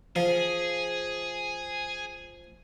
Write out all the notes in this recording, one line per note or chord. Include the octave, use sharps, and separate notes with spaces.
F3 G#4